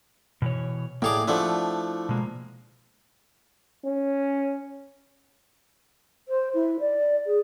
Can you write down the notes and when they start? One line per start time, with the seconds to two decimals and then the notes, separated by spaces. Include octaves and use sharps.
0.42 B2 E3 C#5
1.02 A2 A#3 G#4 C#5 D5 D6
1.28 F3 A3 D4 E4 F#5
2.09 B2 G#3 A#3
3.85 C#4
6.28 C5
6.54 E4
6.80 D5
7.26 G#4